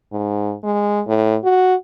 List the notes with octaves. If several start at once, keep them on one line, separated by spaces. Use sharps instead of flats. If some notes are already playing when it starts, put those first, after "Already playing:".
G#2
G#3
A2
F#4